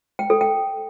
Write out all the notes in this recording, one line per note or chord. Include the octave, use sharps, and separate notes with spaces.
G5
A4
G5